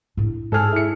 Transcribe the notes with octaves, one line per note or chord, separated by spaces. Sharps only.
A2 D4
G#2 G#4 A4 F6
E4 C#7